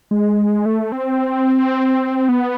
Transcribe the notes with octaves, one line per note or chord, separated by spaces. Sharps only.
G#3
A3
C4
B3